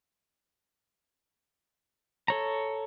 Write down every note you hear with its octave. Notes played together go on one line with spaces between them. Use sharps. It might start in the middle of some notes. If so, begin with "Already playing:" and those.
A4 C#5 A#5